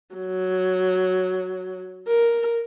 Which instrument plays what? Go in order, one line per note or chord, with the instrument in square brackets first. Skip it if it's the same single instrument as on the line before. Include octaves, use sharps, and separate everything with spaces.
[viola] F#3
A#4